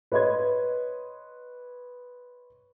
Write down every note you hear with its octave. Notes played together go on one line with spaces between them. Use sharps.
B4 C#5 D#5 C6 G#6